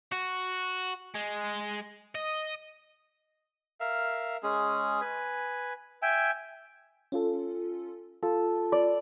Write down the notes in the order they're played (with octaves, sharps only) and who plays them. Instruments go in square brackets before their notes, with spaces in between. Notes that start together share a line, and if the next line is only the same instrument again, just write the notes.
[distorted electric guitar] F#4
G#3
D#5
[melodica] A#4 E5 F5
G#3 C#4 G#4
B4 G#5
E5 G5 G#5
[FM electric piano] C#4 F4 A4
[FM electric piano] F4 [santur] A4
[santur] D5